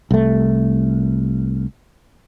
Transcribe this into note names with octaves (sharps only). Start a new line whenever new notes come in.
C2 A3